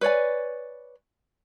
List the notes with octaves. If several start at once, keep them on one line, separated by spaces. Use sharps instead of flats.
B4 C#5 D5 G#5